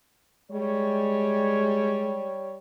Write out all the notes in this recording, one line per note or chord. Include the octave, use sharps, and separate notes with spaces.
G3 G#3 C#5